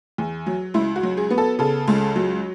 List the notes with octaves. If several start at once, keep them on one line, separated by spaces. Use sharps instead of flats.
E2
F#3
C#2 E4
F#4
F#3
G#4
B3
A4
C#3 A4
C#2
F#3